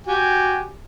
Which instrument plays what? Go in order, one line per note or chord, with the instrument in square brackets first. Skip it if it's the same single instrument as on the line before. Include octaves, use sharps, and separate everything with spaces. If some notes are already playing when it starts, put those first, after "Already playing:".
[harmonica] F#4 G4 G#5